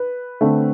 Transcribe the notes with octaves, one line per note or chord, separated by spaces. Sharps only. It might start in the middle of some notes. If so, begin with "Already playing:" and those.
Already playing: B4
D3 A3 C4